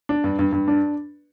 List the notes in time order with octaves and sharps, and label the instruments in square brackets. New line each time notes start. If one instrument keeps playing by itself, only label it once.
[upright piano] D4
G2
G2
G2
D4